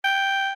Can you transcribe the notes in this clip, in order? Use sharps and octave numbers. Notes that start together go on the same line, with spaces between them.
G5